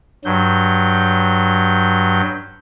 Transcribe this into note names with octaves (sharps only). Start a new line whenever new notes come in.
G2 F#3 G6